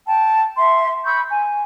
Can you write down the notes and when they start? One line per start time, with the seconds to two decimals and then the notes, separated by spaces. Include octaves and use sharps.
0.06 G5 A5
0.56 E5 F#5 C6
1.04 B5 C#6 E6 G6
1.29 G#5